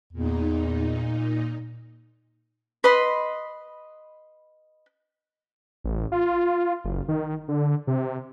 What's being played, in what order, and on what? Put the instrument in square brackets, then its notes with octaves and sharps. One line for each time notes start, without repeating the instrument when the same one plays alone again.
[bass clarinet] E2 [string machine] A#2 D#4
[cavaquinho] B4 D#5 B5 C6
[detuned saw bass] A1
F4
F#1
D#3
D3
C3